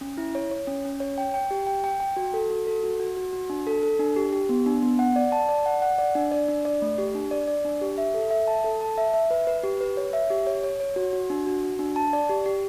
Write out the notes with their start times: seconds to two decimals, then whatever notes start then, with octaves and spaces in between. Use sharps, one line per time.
0.01 C#4
0.18 E4
0.35 C#5
0.51 C#5
0.67 C#4
0.85 C#4
1.00 C#5
1.18 G5
1.34 G5
1.51 G4
1.67 G5
1.84 G5
2.00 G5
2.17 F#4
2.34 A4
2.50 F#4
2.67 A4
2.83 F#4
3.00 F#4
3.17 F#4
3.33 F#4
3.50 D4
3.67 A4
3.83 A4
3.99 D4
4.16 G4
4.33 G4
4.49 B3
4.66 D4
4.82 B3
4.99 F#5
5.16 D5
5.32 A5
5.49 D5
5.66 F#5
5.82 F#5
5.98 D5
6.15 D4
6.32 D5
6.48 D4
6.65 D5
6.82 A3
6.98 G4
7.15 D4
7.31 D5
7.48 D5
7.65 D4
7.81 G4
7.98 E5
8.14 A4
8.31 E5
8.48 A5
8.64 A4
8.81 A5
8.98 E5
9.14 E5
9.31 B4
9.47 B4
9.63 G4
9.81 B4
9.97 C#5
10.13 E5
10.30 G4
10.47 C#5
10.63 C#5
10.80 C#5
10.96 F#4
11.13 F#4
11.30 D4
11.46 F#4
11.63 F#4
11.79 D4
11.96 A5
12.13 D5
12.29 G4
12.46 G4